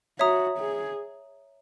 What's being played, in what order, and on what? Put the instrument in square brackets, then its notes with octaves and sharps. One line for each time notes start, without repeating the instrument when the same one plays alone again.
[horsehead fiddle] F#4 [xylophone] C#5 E5 A#5 D#6
[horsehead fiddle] G#4